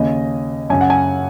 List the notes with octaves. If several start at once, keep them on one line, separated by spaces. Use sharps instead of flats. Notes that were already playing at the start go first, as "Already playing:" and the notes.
Already playing: D#2 C#3 D#5
F#2 C#3 G#5
F#5
G#5